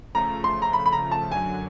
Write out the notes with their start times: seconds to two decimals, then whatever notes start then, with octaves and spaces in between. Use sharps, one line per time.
0.14 C#3 F3 A3 A#5
0.44 C6
0.62 A#5
0.73 B5
0.86 B5
0.93 A#5
1.11 A5
1.31 F#2 D3 F#3 G#5